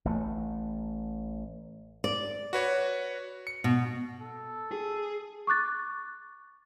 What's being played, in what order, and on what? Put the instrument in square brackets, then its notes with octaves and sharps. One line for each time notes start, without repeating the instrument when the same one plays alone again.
[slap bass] A1 A3
[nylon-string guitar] D5
[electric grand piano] F#4 B4 C#5
C#7
[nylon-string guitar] B2
[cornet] A4
[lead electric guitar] G#4
[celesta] C#6 D6 F#6 A6